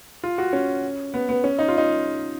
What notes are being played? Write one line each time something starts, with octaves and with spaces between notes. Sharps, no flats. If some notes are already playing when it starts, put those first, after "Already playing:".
F4
F#4
C#4
B3
B3
C#4
D#4
F4
D#4